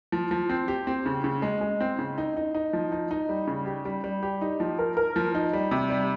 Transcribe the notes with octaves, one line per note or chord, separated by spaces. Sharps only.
F3
F3
C4
G4
C4
C#3
C#3
G#3
G#3
C4
C#3
D#4
D#4
D#4
F3
D#4
D#4
G3
C#3
G4
G3
G3
G4
D#4
F3
A#4
A#4
F3
D#4
G3
C3
G3